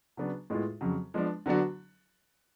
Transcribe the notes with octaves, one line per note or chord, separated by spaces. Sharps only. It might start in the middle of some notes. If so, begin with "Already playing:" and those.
C#3 F#3 B3 D4
A2 G#3 B3 F4 G#4
F2 C#3 F#3
F3 G#3 B3 D4
D3 F#3 B3 D4 F#4